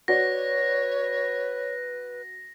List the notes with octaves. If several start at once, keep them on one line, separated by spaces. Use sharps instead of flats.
F#4 B4 C#5 D5 A#6